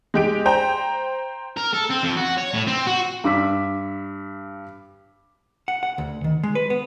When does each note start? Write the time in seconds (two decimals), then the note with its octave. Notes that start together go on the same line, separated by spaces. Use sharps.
0.14 G#3 G4 D7
0.45 C5 G5 A#5
1.57 A#4
1.74 A4
1.91 C4
2.04 F2
2.17 F#4
2.38 C#5
2.54 A2
2.67 C4
2.87 F#4
3.24 G2 D6 E6 B6
5.68 F#5
5.83 F#5
5.98 D2
6.24 D#3
6.43 G#3
6.55 B4
6.70 B3